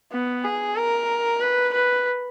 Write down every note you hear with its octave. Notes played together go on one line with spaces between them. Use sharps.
B3
G#4
A#4
B4
B4